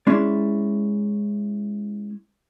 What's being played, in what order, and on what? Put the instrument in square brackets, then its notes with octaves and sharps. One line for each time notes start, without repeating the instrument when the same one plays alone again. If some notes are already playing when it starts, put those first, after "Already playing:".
[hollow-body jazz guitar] G#3 C#4 E4 D5